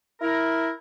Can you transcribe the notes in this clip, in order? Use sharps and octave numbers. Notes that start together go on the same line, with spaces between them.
E4 A#4